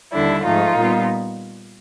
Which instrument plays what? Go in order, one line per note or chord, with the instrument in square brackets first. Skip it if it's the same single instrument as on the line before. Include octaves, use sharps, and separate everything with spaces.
[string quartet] D#2 D3 G3 D4 E4
G#2 F3 A3 D#4 F4
A#2 G3 B3